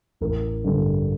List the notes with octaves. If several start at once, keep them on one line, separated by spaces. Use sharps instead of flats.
A1 A#4
G2 D3